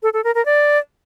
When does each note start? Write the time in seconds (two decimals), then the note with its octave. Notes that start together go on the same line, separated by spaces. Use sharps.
0.03 A4
0.13 A4
0.24 A#4
0.35 A#4
0.46 D5